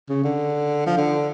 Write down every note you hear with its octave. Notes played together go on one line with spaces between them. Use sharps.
C#3
D3
F3
D3